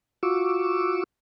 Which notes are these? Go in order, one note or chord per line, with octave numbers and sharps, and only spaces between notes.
F4 F#4 C#6 D6 E6